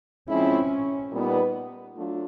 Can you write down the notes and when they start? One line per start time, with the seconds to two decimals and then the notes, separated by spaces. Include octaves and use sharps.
0.29 F3 G#3 C4 C#4 E4
1.12 A#2 G3 B3 D#4
1.96 F#3 A3 D4 F4